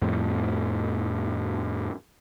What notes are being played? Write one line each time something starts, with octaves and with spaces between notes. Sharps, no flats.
F2 A2 F3